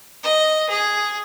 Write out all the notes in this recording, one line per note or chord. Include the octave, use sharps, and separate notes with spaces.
D#5
G#4